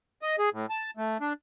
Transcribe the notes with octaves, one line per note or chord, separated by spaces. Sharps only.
D#5
G#4
A2
A5
A3
D4